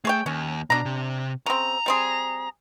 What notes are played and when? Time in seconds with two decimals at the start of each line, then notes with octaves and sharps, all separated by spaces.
0.05 A3 G#4 C#5 G5
0.26 D#2 C#4
0.70 B2 D4 A#5
0.85 C3
1.46 C#3 C4 A#5
1.86 G3 C4 G#4